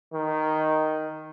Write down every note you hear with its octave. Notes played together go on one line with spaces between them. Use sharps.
D#3